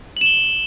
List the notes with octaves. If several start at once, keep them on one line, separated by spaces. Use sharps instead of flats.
E7 F#7 G7